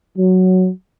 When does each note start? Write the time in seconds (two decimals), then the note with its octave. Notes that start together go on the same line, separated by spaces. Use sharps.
0.18 F#3